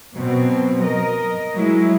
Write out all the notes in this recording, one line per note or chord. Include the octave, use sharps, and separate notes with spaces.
B2 F#3 C4
A#4 D#5
F#3 G#3 E4